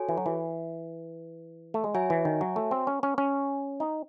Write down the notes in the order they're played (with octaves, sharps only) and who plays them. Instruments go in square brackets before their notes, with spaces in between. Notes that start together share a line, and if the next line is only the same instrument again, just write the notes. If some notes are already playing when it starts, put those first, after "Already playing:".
Already playing: [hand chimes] F#4 A4 C#5 G#5
[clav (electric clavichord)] E3
F#3
E3
A3
G#3
[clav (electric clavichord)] F#3 [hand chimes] F#4 C#5 E5 G#5
[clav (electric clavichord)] E3
D#3
F#3
A3
C4
C#4
C#4
C#4
D#4